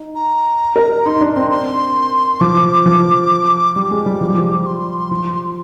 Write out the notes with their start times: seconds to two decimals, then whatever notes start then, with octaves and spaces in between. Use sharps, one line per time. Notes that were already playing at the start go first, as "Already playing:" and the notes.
Already playing: D#4
0.15 A#5
0.76 A#4
1.06 D#4 C6
1.21 D4
1.36 C4 C6
1.51 C6
2.41 F3 D6
2.86 F3
3.76 G3 D6
3.91 G#3
4.06 G3
4.21 F3
4.29 G3
4.38 F3
4.66 C6
5.11 F3